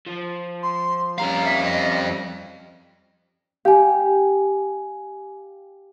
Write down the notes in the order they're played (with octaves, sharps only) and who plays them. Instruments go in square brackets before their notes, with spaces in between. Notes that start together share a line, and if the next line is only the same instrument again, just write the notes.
[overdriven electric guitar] F3
[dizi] C6
[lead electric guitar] F2 F5 [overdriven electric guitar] G3 C#4 [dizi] A#5
[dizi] E5
D#5
[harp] G4 [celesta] F5 G#5